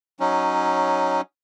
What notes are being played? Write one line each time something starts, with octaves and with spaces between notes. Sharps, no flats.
F#3 C#4 D#4